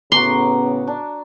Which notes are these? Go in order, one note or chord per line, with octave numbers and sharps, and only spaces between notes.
A2 C#3 B3 F#4 A#5 C6 D6
D4